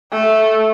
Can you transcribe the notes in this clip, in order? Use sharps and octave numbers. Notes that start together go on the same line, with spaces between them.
A3